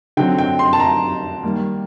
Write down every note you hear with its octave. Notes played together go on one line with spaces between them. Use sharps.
D3 F#3 C4 G5
G5
C6
A5
A#5
D#3 G3 A#3